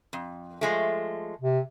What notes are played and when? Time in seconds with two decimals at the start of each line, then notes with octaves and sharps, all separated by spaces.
0.13 F2
0.61 F3 G#3 A3
1.42 C3